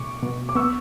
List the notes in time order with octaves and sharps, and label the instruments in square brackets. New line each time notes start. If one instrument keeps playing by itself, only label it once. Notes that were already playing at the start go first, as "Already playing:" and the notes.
Already playing: [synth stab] B2 A3 [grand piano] C#6 D6
[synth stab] B2
[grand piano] D6
[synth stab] B3 [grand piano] C#6 E6